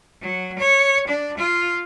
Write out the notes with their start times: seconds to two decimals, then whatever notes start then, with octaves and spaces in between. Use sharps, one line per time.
0.22 F#3
0.59 C#5
1.08 D4
1.37 F4